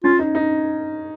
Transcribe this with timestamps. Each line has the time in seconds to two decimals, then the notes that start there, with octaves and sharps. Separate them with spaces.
0.04 C#4 F4
0.19 D#4
0.35 D#4